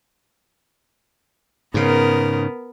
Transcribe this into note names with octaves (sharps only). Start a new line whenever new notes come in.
G#2 C#3 B3 A#4